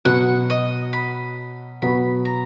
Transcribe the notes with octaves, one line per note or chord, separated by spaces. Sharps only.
B2 F#3 B3 F#4 F#5
D#5
B5
B2 F#3 B3 F#4 B5
A#5